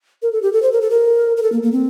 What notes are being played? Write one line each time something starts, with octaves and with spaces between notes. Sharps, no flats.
A#4
A4
G4
A4
C5
A#4
A4
A#4
A#4
A4
A#3
A#3
C4